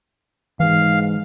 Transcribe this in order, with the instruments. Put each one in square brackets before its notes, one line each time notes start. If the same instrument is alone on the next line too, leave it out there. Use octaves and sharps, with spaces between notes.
[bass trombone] G#2 [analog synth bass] E3 [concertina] F5